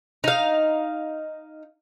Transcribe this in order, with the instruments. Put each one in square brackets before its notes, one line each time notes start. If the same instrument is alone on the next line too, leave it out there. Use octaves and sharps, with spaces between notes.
[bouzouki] D#4 F5